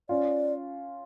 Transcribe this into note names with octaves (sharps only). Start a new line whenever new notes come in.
C#4 F4 D5